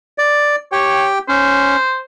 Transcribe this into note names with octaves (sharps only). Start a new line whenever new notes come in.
D5
G4 C#5 G5
C#4 C5